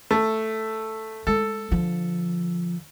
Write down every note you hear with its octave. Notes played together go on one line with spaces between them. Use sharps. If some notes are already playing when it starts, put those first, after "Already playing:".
A3
G#3 A4
D3 F3